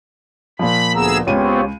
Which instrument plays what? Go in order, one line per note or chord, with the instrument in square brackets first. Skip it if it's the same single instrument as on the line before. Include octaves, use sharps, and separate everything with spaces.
[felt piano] A#2 F3 [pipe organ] B5
[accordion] D2 B3 A#5 [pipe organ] G#4 E6
[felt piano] C#2 D#7 [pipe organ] B3 C4 [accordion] F4 G4 C#5